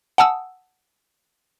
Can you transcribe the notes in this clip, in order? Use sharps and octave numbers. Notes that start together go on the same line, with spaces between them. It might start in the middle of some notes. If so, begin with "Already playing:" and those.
F#5 G#5 A5 D#6 E6